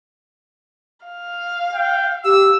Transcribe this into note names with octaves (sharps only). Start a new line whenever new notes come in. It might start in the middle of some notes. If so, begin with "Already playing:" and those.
F5
G5
G4 E6